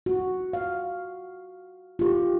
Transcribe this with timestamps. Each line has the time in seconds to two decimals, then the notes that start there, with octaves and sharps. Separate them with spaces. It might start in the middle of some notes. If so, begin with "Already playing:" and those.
0.06 F#4
0.53 F5
1.99 F4 G4